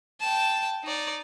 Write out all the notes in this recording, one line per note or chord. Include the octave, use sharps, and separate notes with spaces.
G5 A5
D#4 D5